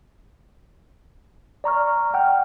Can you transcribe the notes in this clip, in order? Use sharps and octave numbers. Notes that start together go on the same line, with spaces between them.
D5 A#5 C#6 F6
F#5 G5 F6